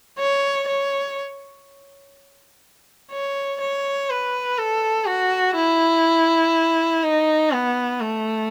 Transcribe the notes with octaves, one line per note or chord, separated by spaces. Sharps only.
C#5
C#5
C#5
C#5
B4
A4
F#4
E4
D#4
B3
A3